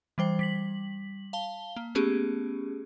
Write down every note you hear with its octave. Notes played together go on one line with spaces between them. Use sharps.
E3 G3 C5 G5
G3 B6 F#7
F5 A5 G7
A#3
A3 B3 C#4 G4 G#4